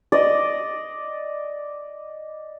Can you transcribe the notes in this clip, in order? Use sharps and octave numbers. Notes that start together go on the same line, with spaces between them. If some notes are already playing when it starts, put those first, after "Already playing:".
D5 D#5